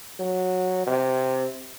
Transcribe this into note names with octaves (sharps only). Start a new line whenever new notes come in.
F#3
C3